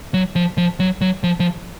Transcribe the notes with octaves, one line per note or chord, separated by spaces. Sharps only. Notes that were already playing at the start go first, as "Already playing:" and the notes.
F#3
F3
F3
F#3
F#3
F3
F3